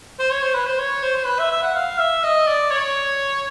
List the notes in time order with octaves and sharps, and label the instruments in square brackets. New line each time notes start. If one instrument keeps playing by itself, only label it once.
[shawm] C5
C#5
C5
B4
C5
C#5
C5
C5
B4
E5
E5
F#5
F5
E5
D#5
D5
C#5